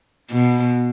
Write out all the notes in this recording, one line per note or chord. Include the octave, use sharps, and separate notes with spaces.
B2